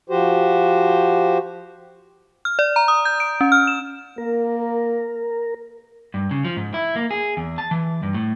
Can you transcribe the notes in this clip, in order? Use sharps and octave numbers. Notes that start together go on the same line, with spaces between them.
F3 F#4 G4 C5
F6
D5
A#5
D#6
G6
D7
C#4
F6
E7
A#3 A#4
G2
C#3
F3
G#2
E4
A#3
G#4
E2
A5
E3
G2
A2